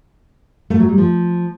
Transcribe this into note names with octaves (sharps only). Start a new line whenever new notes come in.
A3
F#3
G3
F3